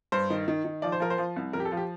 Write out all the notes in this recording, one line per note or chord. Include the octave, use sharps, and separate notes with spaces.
G2 C5
D#3
D#3
D#3
F3 D5
C5
F3 A#4
C5
F3
C2
F2 A#4
G4
A4
F3
G4